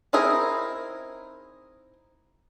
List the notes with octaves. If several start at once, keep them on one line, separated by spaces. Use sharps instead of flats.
C4 D#4 E4 G#4 A#4